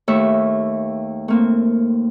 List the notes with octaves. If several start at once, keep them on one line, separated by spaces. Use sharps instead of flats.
D#2 A3 E5 C#6
A3 A#3 C4